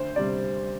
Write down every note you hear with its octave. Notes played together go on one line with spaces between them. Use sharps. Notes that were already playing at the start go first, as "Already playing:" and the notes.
Already playing: D2 C5
C3 G3 D5